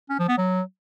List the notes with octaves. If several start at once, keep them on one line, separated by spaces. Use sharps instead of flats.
C#4
F3
B3
F#3